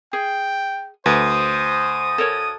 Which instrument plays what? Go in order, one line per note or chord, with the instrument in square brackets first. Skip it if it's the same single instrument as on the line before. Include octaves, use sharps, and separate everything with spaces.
[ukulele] G#4 [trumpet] G5
[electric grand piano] D2 [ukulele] B4 [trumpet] C5 [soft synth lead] D#6
[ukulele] A4 A#4 C#5